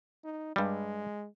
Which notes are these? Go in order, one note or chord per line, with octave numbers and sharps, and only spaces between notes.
D#4
G2 G3 G#3